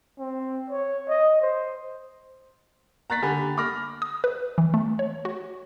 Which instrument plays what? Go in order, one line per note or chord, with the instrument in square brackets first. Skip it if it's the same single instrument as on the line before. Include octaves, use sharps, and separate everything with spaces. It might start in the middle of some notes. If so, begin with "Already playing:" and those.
[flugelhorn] C4
C#5
D#5
C5
[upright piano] A#5 F#6 A6 B6
D3 G4 G#5 B5
B5 D6 F6 A#6
[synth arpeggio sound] D#6
B4
E3
A3
C#5
F#4